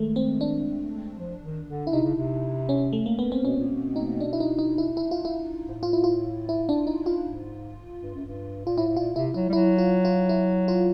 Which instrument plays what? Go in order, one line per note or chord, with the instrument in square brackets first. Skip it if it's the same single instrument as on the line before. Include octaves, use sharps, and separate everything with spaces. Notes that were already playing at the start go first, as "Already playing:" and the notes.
Already playing: [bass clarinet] D#3 [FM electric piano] G#3 A3
[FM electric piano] C4
D4
[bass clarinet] F3
D#3
D3
[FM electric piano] E4
[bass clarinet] C3 [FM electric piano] D#4
[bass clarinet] C#3
C3
[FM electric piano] C#4
A3
A#3
B3
C4
[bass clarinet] B2 [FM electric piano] C#4
[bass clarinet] A#2
B2
[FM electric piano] D#4
D4
E4
D#4
D#4
E4
E4
F4
E4
[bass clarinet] G#2
A2
[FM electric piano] F4
E4
F4
E4
D4
D#4
F4
[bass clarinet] G#2
G2
F#2
G2
[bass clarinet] A#2 [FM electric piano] F4
[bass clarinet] A2 [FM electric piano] E4
[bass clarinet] A2
[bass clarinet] A#2 [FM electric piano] F4
[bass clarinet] C3 [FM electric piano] E4
[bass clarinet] F#3 [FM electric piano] E4
[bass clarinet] G3
[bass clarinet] F#3 [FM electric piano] E4
[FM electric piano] F4
F4
E4
F4